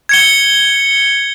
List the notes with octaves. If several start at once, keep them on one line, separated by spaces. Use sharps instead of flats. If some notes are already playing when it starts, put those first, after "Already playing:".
G#6 C#7 G7